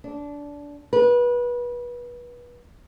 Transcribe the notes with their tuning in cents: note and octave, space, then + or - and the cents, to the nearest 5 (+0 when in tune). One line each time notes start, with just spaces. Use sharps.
D4 -20
B4 -25